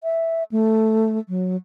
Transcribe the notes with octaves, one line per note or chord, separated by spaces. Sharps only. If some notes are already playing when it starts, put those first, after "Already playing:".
E5
A3
F#3